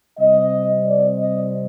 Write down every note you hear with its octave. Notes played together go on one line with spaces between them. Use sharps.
C3 G3 C4 D#5
D5
D#5